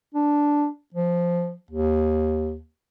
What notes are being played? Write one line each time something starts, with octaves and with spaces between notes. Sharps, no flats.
D4
F3
D#2